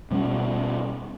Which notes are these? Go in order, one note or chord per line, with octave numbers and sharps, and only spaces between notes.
B2 G3 A#3 C#4